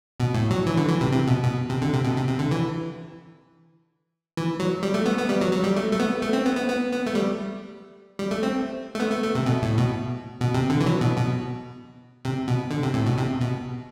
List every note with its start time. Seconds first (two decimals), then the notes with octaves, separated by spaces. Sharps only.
0.20 B2
0.34 A2
0.51 F#3
0.66 E3
0.77 D3
0.88 E3
1.01 C3
1.13 C3
1.28 B2
1.43 B2
1.70 C3
1.82 D3
1.94 C3
2.04 B2
2.16 C3
2.28 C3
2.39 D3
2.51 E3
4.37 E3
4.60 F#3
4.83 G3
4.94 A3
5.06 B3
5.18 B3
5.29 G3
5.41 F#3
5.52 F#3
5.64 G3
5.76 A3
5.92 A3
5.99 B3
6.22 A3
6.33 C4
6.46 B3
6.56 B3
6.69 B3
6.92 B3
7.07 A3
7.15 G3
8.19 G3
8.31 A3
8.43 C4
8.95 A3
9.00 B3
9.11 A3
9.23 A3
9.35 C3
9.46 B2
9.62 A2
9.78 B2
10.40 B2
10.55 C3
10.70 D3
10.81 E3
10.86 F#3
11.01 B2
11.16 B2
12.25 C3
12.48 B2
12.71 D3
12.83 C3
12.94 A2
13.06 B2
13.18 C3
13.40 B2